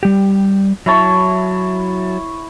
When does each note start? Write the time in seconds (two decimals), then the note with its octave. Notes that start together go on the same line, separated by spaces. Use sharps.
0.03 G3 G4
0.86 F#3 E4 C#5 A5